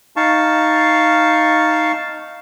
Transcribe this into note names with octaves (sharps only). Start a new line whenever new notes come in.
D#4 F5 A5 C#6